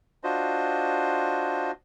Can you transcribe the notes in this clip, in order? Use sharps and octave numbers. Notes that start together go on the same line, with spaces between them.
D4 F4 F#4 C5 D#5